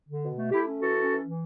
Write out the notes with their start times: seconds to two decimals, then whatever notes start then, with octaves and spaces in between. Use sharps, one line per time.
0.09 D3
0.24 B2
0.38 A3
0.52 A3 E4 G4
0.66 C#4
0.80 E3 F#4 A4
0.96 C#4
1.10 E3
1.24 E3